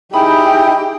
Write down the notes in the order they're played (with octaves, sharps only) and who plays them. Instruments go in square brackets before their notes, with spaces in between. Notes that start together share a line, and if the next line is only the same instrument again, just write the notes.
[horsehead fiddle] D#4 G4 [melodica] E4 G#4 [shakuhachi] G5 [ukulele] B5